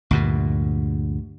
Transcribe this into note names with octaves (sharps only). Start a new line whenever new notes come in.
D2 G2 A#2